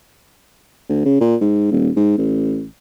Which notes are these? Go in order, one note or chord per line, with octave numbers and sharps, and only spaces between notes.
D2
C#3
A#2
G#2
D#1
G#2
A1